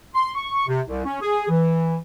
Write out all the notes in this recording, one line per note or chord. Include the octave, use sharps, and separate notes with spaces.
C6
C#6
C3
C2
C#4
G#4
E3